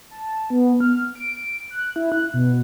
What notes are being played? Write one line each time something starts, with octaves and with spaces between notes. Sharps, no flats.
A5
B3
F6
D7
F#6
E4
F#6
B2